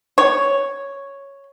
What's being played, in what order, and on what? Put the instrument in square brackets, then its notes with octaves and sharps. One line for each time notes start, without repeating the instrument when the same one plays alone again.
[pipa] C#5